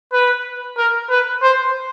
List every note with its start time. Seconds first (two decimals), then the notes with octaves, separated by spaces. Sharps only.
0.13 B4
0.77 A#4
1.10 B4
1.42 C5